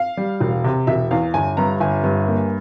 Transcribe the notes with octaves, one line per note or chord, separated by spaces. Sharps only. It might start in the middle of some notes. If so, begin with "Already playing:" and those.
Already playing: F5
G3
E1
C3
E1 E5
E2 F5
G1 G#5
G2 A#5
G1 G#5
G2
A#3